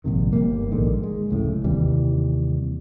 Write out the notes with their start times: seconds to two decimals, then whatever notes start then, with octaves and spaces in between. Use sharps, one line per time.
0.04 A#1 G#2 C3 D#3
0.33 G1 G3 A#3
0.71 A#1 G#2 D3 D#3
1.03 G#3
1.29 F1 C#2 A2
1.64 D#2 C3 E3 G3